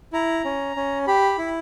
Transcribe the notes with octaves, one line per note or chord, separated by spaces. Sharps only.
E4 A#5
C#4
C#4
G4 B5
E4